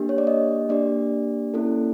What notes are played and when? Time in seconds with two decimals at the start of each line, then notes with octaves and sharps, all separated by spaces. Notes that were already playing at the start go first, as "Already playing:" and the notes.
Already playing: A#3 D4 G4
0.09 C#5
0.18 D5
0.27 D#5
0.69 A#3 D4 G4 D5
1.54 A#3 C#4 E4 A4